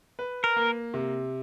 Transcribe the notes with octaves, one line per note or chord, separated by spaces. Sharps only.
B4
A#4
A#3
C3